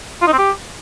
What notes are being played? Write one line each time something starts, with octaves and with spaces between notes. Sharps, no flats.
F4
D#4
C4
G4